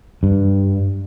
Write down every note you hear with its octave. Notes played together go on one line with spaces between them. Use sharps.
G2